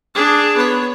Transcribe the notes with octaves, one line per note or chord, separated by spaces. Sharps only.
D4 G#4
B3 C#5